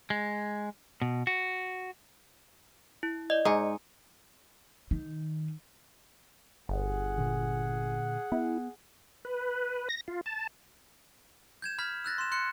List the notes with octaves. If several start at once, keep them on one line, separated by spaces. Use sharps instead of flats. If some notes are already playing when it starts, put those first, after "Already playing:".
G#3
B2
F#4
E4
D5 D#5
G#2 G#5 A#5 D#6
D#3
G1 G#4 F#5
A#2 D3
B3 E4
B4
A#6
F4
A5
G6 G#6 E7
B5 F6 G#6 B6
E6 F#6 A6 A#6
C6 E7
C6 F#6 C#7